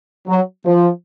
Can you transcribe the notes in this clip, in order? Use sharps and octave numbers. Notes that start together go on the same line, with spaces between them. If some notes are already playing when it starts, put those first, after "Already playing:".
F#3
F3